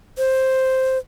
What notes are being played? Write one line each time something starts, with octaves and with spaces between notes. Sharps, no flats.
C5